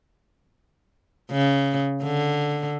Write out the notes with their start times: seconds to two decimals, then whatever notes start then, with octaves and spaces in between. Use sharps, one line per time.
1.31 C#3
2.04 D3